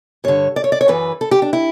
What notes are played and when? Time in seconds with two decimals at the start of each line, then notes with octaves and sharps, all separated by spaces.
0.24 G2 D3 C#5
0.56 D5
0.64 C#5
0.72 D5
0.81 C#5
0.88 F#2 E3 B4
1.21 A4
1.31 G4
1.42 D4
1.53 E4